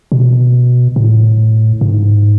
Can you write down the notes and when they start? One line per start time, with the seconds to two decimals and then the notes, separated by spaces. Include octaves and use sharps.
0.12 B2
0.96 A2
1.81 G#2